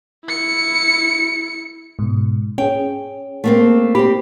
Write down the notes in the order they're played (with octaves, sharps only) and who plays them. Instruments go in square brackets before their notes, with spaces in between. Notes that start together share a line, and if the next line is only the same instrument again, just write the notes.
[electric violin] E4 C#7
[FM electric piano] G#2 B2
[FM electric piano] C#4 G#4 [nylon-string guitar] G5
[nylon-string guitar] A3 A#3 C4
[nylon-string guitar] C4 G4 [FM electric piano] B5